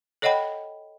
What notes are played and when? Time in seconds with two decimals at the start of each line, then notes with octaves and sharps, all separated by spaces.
0.22 A4 C#5 D#5 F#5 G5 B5